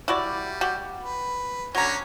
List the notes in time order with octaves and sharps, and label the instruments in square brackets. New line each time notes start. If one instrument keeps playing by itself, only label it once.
[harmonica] G3 [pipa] E4 F#4 D5
[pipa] F#4 G4
[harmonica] B4
[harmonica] D3 C#4 C#5 [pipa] F#3 A#5